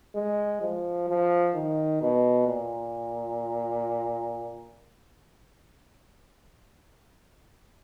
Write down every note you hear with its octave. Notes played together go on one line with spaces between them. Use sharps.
G#3
F3
F3
D#3
B2
A#2